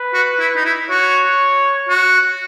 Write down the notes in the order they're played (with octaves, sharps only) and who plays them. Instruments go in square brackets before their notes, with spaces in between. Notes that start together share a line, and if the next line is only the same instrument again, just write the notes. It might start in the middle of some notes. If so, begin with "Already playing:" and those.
Already playing: [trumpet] B4
[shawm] F#4
E4
D#4
E4
[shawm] F#4 [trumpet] C#5
[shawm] F#4